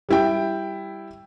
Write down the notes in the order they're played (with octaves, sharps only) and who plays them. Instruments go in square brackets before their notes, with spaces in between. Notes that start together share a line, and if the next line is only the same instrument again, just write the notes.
[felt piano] G3 E4 G5